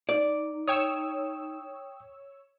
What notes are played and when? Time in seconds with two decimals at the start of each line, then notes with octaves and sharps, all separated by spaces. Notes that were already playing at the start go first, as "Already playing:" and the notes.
0.09 D#4 D5
0.68 C#5 G5 D#6 E6